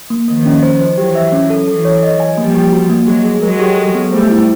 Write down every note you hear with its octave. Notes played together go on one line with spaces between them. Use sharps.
A#3
D#3 F3 A#3
C#4
C5
C5
E3 F#3 G4
E5
C#4
A4
E3 F#3 A4
C#5
D#5
G#5
F3 G3 A#3
G4
F#4
A#3
F#3 G#3 G#4
G#4
F#3 G#3 A#4
G4
A4
B3
G3 A3 C5
E4